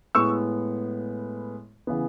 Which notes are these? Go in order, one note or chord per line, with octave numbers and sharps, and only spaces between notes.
A2 G#3 B3 C#6 E6
C#3 E3 B3